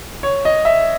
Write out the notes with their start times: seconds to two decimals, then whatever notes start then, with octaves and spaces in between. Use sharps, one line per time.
0.23 C#5
0.45 D#5
0.65 E5